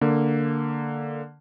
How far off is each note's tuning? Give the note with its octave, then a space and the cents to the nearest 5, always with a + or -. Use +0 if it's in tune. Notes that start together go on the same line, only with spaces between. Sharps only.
D3 +0 A#3 -10